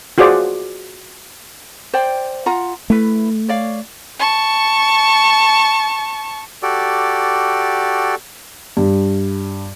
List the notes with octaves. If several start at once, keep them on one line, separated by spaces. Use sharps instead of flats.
F4 F#4 G#4 C5 D5
C5 D5 G5
F4 F#5 A#5
A3 E4 B4
C#5 D5 F5
A5 C#6
F#4 G4 A4 D5
G2